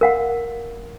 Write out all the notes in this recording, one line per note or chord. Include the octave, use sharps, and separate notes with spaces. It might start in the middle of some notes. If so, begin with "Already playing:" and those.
A#4 F5 F#5